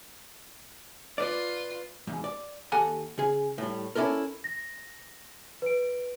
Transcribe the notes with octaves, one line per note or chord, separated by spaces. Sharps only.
F4 B4 D5
E2 G#2 B2
D5
D#2 G4 A4 F#5 G#5 A#5
C#3 G#4
A2 G3
C#4 D4 E4 A4 A#4
A#6
B4 D7